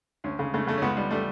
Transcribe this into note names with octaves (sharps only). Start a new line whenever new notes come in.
D2 C#4
C#3
C#3 A3
C#3 A3
C#4
C#2 B3
G3
G3 A3